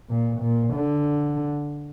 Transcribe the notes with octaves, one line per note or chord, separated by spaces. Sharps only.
A#2
A#2
D3